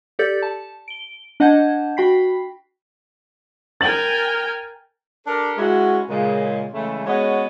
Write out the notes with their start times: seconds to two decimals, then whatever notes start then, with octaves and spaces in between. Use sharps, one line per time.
0.19 G4 A4 D5 G6 A6 C#7
0.42 A5
0.88 D7 G7
1.40 D4 D#5 F#5 A5 G6 G#6
1.97 F#4 G5 B5 B6 C7
3.81 A#4 G5 G#5 A6 F#7
5.27 D4 G4 A4 A#4
5.58 G#3 C#4 E4 F#4
6.10 A#2 C#3 G#3
6.72 C#3 E3 G#3 A3
7.07 G#3 B3 C#4 F#4 C#5 D#5